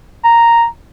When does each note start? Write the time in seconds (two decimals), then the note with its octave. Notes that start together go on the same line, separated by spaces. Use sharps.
0.24 A#5